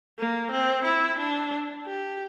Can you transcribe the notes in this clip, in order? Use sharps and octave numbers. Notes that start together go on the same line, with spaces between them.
A#3
C4
E4
D4
G4